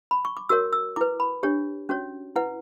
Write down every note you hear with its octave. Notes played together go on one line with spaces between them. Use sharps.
B5
C#6
D6
F#4 A#4 C#5 E6
E6
E4 B4 D6
B5
D4 G4 C#5
C#4 F#4 C#5
E4 B4 F#5